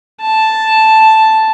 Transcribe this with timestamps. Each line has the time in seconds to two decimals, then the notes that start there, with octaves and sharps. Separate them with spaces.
0.21 A5